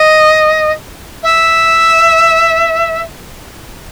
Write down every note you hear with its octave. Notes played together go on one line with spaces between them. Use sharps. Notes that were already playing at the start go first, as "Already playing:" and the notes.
Already playing: D#5
E5